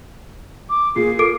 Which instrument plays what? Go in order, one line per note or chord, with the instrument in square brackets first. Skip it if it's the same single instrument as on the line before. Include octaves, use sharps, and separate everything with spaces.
[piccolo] D6
[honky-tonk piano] A#2 A#3 [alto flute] G#4 [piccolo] C7
[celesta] A4 D6 D7 [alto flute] A#4